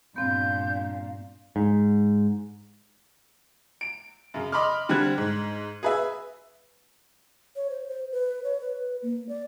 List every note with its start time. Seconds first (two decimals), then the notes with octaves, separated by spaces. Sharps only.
0.16 G2 A#2 B3 C4 F5 G6
1.56 G#2
3.81 D7
4.34 F#2 C#3
4.52 D#5 B5 C6 D6 F6
4.89 D3 G3 C4 F#6 G#6
5.18 G#2
5.83 G#4 B4 E5
7.56 C#5
7.70 C5
7.87 C5
8.12 B4
8.44 C#5
8.61 B4
9.02 A#3
9.29 D5